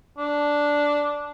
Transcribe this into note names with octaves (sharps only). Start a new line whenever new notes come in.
D4